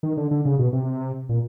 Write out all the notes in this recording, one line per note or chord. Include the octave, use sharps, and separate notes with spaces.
D#3
D3
D3
C#3
B2
C3
A#2